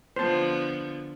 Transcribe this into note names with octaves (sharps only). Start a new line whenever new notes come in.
D3 F3 B3 C5 A5